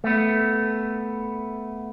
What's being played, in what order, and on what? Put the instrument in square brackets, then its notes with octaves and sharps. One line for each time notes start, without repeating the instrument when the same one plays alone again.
[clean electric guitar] A3 B3